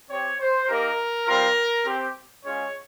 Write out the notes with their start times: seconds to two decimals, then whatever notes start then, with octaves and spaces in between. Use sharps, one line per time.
0.10 C4 G4 C#5
0.40 C5
0.68 A#3 D#4 G4 A#4
1.26 G3 C4 F4 A#4
1.86 C4 G4
2.43 G#3 C#4 F4 C#5